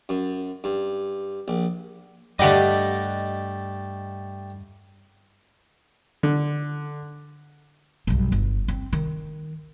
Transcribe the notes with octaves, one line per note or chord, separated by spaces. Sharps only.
F#2
G2
A#1
G2 D3 G3 A3 G4 D5 D#5 F#5
D3
B1 G2
G1
C4
D#3